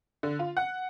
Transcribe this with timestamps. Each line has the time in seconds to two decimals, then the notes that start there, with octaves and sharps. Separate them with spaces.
0.23 D3
0.39 F4
0.57 F#5